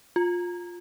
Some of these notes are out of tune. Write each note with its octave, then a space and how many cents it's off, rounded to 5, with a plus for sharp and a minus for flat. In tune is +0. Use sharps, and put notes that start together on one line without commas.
F4 +15